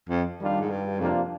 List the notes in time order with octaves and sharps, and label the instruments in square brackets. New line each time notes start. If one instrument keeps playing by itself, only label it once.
[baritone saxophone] F2
[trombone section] D#3 G3 D4 F4
[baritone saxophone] G#2
G2
[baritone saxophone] F2 [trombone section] C3 F3 A#3 D4 F4